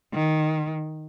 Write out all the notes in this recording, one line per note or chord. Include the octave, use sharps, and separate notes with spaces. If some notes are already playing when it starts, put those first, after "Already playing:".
D#3